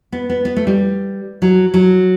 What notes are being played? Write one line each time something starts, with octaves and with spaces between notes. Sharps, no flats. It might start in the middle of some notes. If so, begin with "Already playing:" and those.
B3
B3
B3
A3
G3
F#3
F#3